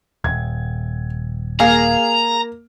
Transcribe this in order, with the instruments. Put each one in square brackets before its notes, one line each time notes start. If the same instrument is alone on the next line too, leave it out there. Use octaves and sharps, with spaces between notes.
[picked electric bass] D#1 [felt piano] G#6
[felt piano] A#3 [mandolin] G#4 F5 [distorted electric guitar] A#5